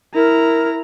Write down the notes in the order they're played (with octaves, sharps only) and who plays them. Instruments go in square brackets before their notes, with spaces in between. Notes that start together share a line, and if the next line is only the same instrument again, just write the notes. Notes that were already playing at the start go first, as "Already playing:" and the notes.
[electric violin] E4 A#5 [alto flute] A#4